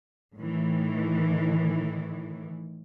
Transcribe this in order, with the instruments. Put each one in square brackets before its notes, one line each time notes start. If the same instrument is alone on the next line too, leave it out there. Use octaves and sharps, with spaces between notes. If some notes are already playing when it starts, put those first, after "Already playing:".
[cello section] A2 D#3 E3